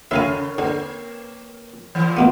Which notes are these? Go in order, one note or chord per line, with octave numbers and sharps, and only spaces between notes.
C#3 A#4 C#5 E5 F5 G#5
D3 A#3
A#2 E3
B2 A#3 B3